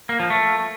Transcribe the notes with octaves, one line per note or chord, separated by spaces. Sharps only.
A#3
F3
A3